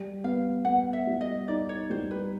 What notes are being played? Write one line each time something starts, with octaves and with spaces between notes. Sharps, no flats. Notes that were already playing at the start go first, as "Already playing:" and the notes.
Already playing: G3
B3 F5
B3 F#5
E5
G3
D#5
D#4 D5
C#5
G3 C5
B4